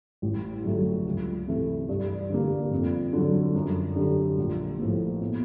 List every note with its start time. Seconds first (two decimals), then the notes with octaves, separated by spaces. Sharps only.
0.22 A1
0.64 G2 D3 F#3 A3
1.05 C#2
1.47 C3 E3 A3
1.89 G2
2.30 D3 G3 A#3
2.71 F2
3.13 D3 F#3
3.55 F#2
3.96 D3 G3
4.38 A#1
4.79 A2 F3 A#3
5.21 B2